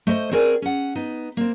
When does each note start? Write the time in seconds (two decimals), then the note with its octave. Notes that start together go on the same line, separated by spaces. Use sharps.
0.07 A3 C5 D#5
0.31 C4 F#4 G#4 A#4 D5 G#5
0.62 C#4 F#5
0.95 B3 D#4
1.37 A#3 C4